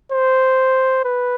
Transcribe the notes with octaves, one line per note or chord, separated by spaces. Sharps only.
C5
B4